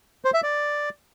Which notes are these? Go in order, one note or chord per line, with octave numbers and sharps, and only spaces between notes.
C5
E5
D5